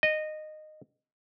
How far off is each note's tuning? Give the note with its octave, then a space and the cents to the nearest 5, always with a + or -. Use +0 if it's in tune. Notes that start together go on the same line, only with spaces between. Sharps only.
D#5 -15